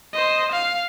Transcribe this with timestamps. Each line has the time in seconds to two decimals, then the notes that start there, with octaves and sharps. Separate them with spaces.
0.13 C5 D#5
0.52 F5